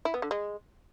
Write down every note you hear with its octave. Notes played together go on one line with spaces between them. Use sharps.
E4
B3
D3
G#3